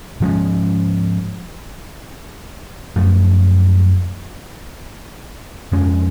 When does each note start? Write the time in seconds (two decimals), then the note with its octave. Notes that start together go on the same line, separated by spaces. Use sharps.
0.20 G#2 F3 G#3 C#4
2.96 F#2 F3 A3
5.72 F2 F3 G#3 C#4